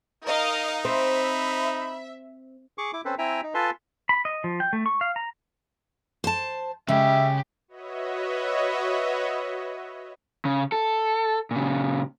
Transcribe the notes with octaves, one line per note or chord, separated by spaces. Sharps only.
D#4 A#4 D#5 F5
C4 E5 B5
G#4 C#6 D6
E4 D6
C4 C#4 A4 B4 C5
C4 E4 E5 G5 G#5 A#5
D#4
F4 A4 B4 G#5 A5 C6
B5
D#5
F3
G5
A3
C#6
F5
A#5
C5 A5
C#3 G#3 G4 E5
F#4 B4 C#5 D#5 E5
C#3
A4
A#2 C#3